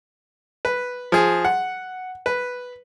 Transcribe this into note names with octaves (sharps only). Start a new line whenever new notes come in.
B4
F3 G#4
F#5
B4